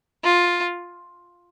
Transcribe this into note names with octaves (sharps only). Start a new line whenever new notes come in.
F4